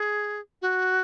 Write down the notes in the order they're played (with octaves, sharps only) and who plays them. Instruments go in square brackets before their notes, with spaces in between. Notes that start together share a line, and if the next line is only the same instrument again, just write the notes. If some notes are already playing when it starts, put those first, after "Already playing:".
Already playing: [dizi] G#4
F#4